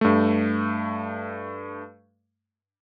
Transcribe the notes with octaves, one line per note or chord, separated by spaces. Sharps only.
G2 A3